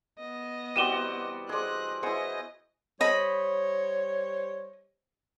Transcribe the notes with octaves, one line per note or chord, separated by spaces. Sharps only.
B3 D#5
E3 G3 C4 F#4 D5 D#7 E7 G7
G#4 C5 D5 D#5 C6 F#6
B3 E4 G#4 C5 C#5 D#5
G3 C5 C#5 D#5 B5